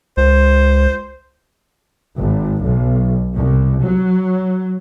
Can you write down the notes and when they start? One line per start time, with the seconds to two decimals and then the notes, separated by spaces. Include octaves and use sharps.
0.17 C#2 C5
2.19 G#1
2.63 B1
3.36 C2
3.83 F#3